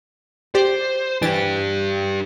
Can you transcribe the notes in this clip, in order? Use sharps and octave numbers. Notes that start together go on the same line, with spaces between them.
G4 C5 D5
E3 D4 G4 A6